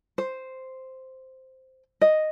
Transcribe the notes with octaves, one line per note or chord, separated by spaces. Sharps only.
C5
D#5